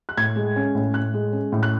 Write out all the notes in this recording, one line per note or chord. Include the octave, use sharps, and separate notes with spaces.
F#6
A2 G#6
G#3
C#4
A2
A2 F#6
G#3
C#4
A2
F#6